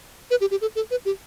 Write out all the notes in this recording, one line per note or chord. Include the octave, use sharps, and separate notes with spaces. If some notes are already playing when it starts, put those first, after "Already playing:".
B4
G4
G4
A4
A4
B4
G4